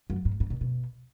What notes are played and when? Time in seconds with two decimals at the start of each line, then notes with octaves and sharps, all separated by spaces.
0.10 F#2
0.25 G#2
0.40 G#2
0.50 A#2
0.61 B2